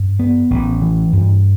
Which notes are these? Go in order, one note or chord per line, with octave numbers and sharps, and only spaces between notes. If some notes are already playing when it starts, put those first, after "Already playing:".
Already playing: G2
B3
A1
E3
G2